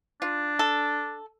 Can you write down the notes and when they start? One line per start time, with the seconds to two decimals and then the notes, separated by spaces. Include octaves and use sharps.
0.22 D4 F4
0.59 A4